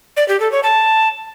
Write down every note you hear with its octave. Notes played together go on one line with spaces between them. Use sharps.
D5
G4
A4
C#5
A5